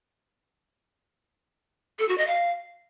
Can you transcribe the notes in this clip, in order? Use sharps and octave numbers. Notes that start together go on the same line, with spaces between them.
A4
F#4
D#5
F5